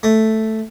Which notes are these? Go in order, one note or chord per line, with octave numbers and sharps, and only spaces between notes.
A3